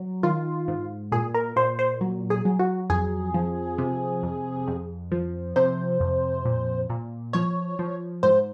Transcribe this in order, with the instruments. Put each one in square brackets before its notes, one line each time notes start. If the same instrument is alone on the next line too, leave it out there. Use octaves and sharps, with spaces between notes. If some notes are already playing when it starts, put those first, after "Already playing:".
Already playing: [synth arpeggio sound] F#3
D#3 F4
G#2
A#2 G#4
A#4
A#2 C5
C5
F#3
G#4
F#3
F#4
F2 G#4
F3
C3
F2
F2
F3
C3 C5
F2
A#2
A#2
F3 C#5
F3
G#2 C5